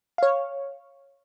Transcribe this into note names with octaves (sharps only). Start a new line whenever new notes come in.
C#5 F5